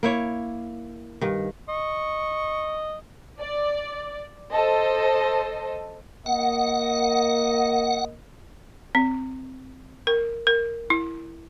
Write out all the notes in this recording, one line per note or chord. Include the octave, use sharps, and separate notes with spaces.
A#3 E4 C#5
G2 D#3
D#5 C#6
D5
A4 C5 D#5
A#3 D#5 F#5
C4
A#4
A#4
E4